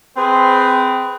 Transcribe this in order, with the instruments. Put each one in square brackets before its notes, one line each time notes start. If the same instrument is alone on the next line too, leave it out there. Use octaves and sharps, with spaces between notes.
[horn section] C4 G#4 B4